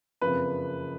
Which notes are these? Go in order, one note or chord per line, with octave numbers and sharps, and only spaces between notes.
F#1 F2 F3 B4